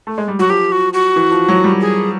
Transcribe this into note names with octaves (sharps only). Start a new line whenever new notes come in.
A3
G#3
G3
F#3 F#4
F3 G4
F#4
F#4
E3
F3
F#3
G3
G#4